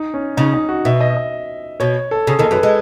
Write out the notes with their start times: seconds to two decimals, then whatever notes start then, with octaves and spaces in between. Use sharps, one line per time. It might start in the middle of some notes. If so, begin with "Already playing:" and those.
Already playing: D#4
0.14 C#4
0.37 C#3 D#4
0.54 D#4
0.69 F#4
0.85 B2 E5
1.00 D#5
1.17 D#5
1.80 B2 C#5
2.11 A4
2.27 C#3 G#4
2.39 D#2 D#3 A4
2.51 F#2 F#3 B4
2.63 G#3 A4